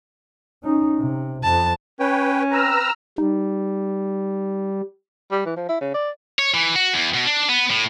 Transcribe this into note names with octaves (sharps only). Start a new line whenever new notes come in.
C#4 D#4
C3
F2 A5
C#4 B4 C#5 G5
C4 B4 A#5 E6 F6
G3 D#4
G3
E3
F3
E4
C#3
D5
C#5
E3
F#4
E2
B2
D4
B3
A2